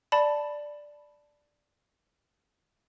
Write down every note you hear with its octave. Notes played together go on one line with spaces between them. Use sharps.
D5 A5 B5